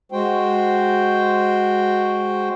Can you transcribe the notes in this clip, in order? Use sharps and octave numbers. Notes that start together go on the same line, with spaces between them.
G#3 F#4 C5 G5